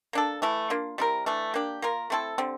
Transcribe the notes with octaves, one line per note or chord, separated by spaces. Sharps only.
A#3 D4 A4
E3 A3 E4
A#3 D4 F4
G3 C4 E4 A#4
E3 A3 D4
A#3 D4 G4
A#3 F4 A#4
A3 C4 E4 A4
D3 G3 C4